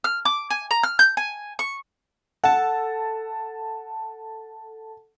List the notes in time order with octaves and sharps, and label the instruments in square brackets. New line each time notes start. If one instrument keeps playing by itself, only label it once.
[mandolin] F6
D6
G#5
A#5
F6
G6
G#5
C#6
[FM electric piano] A4 A5 [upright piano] F#5